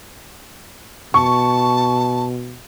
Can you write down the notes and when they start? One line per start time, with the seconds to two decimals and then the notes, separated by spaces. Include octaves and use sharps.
1.14 B2 A5 C#6